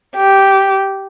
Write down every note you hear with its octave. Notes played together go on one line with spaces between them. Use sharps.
G4